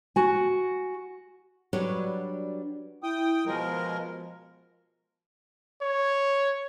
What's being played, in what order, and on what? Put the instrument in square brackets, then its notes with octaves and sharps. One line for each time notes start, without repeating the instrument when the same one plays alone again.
[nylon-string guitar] F#4 G#5
F#3 G3 D4 F#4 B4 C#5
[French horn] E4 [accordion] G5 D#6
[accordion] B2 G#3 A#4 [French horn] F3
[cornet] C#5